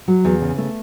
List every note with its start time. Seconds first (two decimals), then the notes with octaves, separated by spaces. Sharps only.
0.08 F#3
0.25 E2
0.42 C#3
0.58 A3